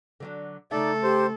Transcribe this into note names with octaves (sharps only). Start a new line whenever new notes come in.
D3 F#3 D4
C#3 A3 D#4 A4 D5 E5
G4 C5